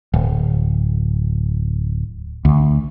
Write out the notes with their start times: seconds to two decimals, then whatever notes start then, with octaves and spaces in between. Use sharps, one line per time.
0.14 D1
2.45 D2